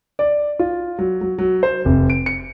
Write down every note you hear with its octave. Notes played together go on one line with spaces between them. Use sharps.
D5
F4
F#3
F#3
F#3
C5
F1
D7
C#7